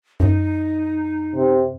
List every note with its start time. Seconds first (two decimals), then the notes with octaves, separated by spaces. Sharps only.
0.20 F#2 D#4
1.35 C3